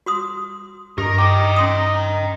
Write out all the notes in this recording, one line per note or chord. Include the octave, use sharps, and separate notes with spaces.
F#4 C6 D#6
G2 D#4 G4 A#4
D#4 D#5 G5 D6
C#4 C6 D#6